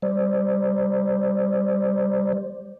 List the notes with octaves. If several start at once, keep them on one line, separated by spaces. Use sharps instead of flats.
G3 C5 D5